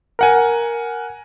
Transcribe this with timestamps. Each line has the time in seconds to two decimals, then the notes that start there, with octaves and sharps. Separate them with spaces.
0.19 A#4 F#5 G#5